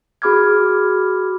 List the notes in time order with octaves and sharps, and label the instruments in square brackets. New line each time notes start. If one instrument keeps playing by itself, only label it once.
[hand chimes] F#4 G#4 B5 D6 F6 G#6